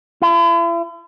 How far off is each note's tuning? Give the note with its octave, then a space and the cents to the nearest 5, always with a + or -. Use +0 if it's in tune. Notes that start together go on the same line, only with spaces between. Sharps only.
E4 +45